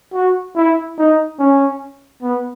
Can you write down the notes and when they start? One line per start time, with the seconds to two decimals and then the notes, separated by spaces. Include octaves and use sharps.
0.13 F#4
0.56 E4
0.98 D#4
1.39 C#4
2.23 B3